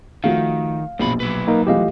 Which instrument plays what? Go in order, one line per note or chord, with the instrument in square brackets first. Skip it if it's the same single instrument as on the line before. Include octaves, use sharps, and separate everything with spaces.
[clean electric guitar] D#3 [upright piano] F3 A3 F#4 [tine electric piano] F5
[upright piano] A#1 B2 [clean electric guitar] F#2 C4 B5
[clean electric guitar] F#3 B4
[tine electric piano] A#3 D#4 A#4
[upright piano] E3 F3 A3 [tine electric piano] G4 D#5 F5